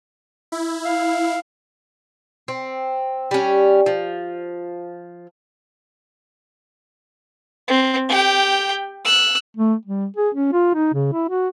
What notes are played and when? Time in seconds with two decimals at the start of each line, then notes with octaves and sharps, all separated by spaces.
0.52 E4
0.85 F5
2.48 C4
3.31 G3 C#4
3.86 F3
7.68 C4
8.09 G4 G5
9.05 E6 F#6
9.57 A3
9.85 G3
10.16 G#4
10.34 C#4
10.53 F4
10.75 D#4
10.94 C#3
11.13 E4
11.29 F#4